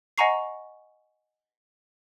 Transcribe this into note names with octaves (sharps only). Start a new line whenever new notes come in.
D#5 F#5 G#5 A#5 C#6 C7